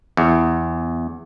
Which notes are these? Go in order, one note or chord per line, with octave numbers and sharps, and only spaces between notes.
E2